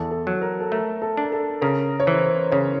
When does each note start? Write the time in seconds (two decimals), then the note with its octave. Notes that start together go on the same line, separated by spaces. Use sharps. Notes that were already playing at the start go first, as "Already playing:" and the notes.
Already playing: E2 A4
0.11 A4
0.27 F#3
0.42 A#4
0.61 A4
0.72 A3 A#4
1.02 A4
1.17 D4
1.32 A4
1.61 C#3 A#4
2.00 C#5
2.07 E3 C5
2.52 C#3 C#5